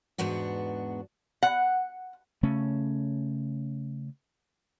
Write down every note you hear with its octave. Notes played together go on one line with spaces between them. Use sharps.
E2 G#2 B3 D4 F#4
F#5
C#3 A3 C#4